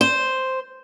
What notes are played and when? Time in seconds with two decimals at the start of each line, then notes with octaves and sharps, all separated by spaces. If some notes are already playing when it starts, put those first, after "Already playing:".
0.01 C5